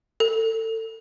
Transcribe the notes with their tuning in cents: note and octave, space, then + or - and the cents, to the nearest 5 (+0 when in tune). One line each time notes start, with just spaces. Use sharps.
A4 +30